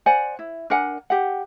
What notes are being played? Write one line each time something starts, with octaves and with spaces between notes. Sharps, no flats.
C5 D5 F#5 G#5
E4
D4 A#4 F#5 G#5
G4 F#5